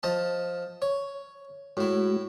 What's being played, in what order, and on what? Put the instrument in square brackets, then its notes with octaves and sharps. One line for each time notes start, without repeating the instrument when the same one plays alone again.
[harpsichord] F3 D#5 A5
C#5
[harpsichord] A2 E4 [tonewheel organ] G#3 F#4